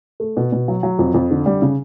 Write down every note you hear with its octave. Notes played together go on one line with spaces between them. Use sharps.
A3
B2
B2
F#3
F#3
F2
F2
D3
G3
C#3